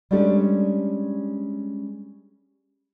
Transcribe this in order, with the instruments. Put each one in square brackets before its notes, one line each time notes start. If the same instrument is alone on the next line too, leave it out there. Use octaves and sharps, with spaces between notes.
[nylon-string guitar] G3 G#3 C#4 D4 G4 A4